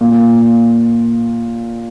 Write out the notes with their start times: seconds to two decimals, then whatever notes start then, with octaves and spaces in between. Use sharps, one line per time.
0.01 A#2